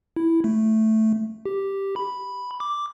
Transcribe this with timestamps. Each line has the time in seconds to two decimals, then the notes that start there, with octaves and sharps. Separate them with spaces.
0.16 E4
0.44 A3
1.46 G4
1.96 B5
2.60 D6